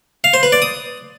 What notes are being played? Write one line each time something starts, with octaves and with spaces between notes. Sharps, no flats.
F5
C5
B4
D5
D#6